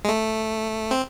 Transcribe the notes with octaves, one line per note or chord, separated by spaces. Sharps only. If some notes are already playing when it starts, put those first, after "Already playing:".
G#3
A3
C4